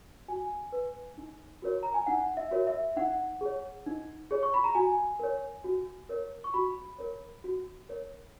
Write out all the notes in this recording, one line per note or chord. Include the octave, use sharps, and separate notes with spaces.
F#4 G#5
B4
D#4
F#4 A#4 C#5
A#5
G#5
D#4 F#5
E5
F#4 A#4 C#5
E5
D#4 F#5
G#4 C#5
D#4
G#4 C#5
C#6
B5
A#5
F#4 G#5
A#4 C#5
F#4
A#4 C#5
C#6
F#4 B5
A#4 C#5
F#4
A#4 C#5